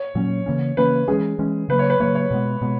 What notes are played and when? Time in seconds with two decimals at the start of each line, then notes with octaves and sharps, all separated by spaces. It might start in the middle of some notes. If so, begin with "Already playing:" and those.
Already playing: C#5
0.15 A#2 F#3 A#3 C#4
0.46 C#3 E3 A#3 C#4
0.77 C#3 E3 A#3 C#4 B4
1.08 E3 G#3 C#4 G#4
1.39 E3 G#3 C#4
1.69 C#3 F#3 A#3 B4
1.79 C#5
1.90 B4
2.00 C#3 F#3 A#3 C#5
2.15 C#5
2.31 B2 G#3 B3
2.62 B2 G#3 B3